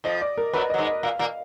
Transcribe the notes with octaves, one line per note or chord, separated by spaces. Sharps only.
F2 F3 D#5
D5
A#4
F#2 F#3 B4
F#3 D#5
G#2 G#3
D#5
A#2 A#3 F5
A#2 A#3